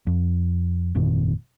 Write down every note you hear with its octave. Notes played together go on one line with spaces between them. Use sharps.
F2
G1 F2 A#2 D#3